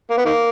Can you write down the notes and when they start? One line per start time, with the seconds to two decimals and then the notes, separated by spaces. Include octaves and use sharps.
0.10 A#3
0.18 B3
0.25 D#3 A#3